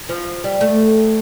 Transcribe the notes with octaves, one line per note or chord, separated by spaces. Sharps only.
F3
G3
A3